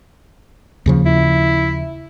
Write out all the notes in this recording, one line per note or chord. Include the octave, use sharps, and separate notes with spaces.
D#2 C#3 F3
E4